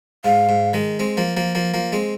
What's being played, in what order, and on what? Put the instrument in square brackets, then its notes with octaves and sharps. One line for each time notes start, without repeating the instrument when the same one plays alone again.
[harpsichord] G#2 [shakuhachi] F5
[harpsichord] G#2
D#3 G#3
G#3 C4
F3 A#3
F3 A#3
F3 A#3
F3 A#3
G#3 C4